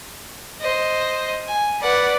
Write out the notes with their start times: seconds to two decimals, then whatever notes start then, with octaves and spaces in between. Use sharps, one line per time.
0.60 C5 D#5
1.46 G#5
1.81 B4 D5 F#5